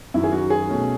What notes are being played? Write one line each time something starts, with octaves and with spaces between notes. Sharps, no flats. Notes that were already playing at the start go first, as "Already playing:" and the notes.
F#2 D#3 F#3 E4
G#4
F#4
G#4
B2 A3 C#4